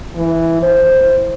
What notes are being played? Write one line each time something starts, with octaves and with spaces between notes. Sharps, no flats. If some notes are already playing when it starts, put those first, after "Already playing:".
E3
C5